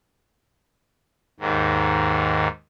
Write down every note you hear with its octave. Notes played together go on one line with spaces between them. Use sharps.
D#2 G#2 D#3